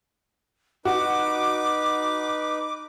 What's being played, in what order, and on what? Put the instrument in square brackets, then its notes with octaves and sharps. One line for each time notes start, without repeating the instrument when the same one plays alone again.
[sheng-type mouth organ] D#4 B4 [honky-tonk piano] F#4 [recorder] D6